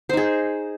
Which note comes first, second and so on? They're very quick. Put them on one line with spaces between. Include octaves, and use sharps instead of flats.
C5 D#4 G#4